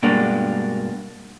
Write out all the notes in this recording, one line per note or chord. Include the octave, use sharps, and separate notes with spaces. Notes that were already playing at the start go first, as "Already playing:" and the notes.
G2 B2 G#3 A#3 D4